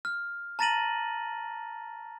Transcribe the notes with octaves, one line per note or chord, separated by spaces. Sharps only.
F6
A5 A#5 A6 A#6 D#7 F#7